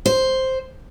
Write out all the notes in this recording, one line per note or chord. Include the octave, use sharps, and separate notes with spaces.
C5